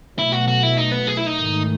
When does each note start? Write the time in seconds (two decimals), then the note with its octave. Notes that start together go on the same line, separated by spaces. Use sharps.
0.17 B2 F#3 A3 E4
0.32 F#4
0.48 F#4
0.63 E4
0.77 D#4
0.92 B3
1.07 G#4
1.17 E4
1.27 D#4
1.36 G#2 D#3 A3